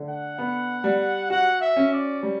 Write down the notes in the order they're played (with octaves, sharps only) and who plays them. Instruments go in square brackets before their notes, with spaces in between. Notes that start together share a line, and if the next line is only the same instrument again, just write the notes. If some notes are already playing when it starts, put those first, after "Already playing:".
Already playing: [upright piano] D3 A3
[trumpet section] F#5
[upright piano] B3
G3
[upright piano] F#4 [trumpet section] F#5
[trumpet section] E5
[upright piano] C#4
[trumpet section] D5
[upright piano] G3